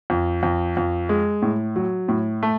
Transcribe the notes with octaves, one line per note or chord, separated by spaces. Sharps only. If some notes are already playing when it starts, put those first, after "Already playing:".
F2
F2
F2
G#3
A2
F#3
A2
A3